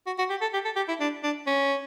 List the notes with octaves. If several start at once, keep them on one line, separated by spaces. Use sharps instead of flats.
F#4
F#4
G4
A4
G4
A4
G4
E4
D4
D4
C#4